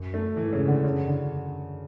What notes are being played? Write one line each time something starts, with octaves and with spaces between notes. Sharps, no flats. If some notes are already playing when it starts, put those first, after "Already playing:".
Already playing: F#2
A3
G#2 E3
C#3
D3
F#2 C#3
D3